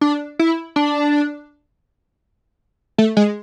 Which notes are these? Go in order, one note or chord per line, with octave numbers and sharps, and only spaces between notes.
D4
E4
D4
A3
G#3